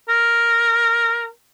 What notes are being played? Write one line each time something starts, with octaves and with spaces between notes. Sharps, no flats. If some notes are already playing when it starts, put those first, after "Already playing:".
A#4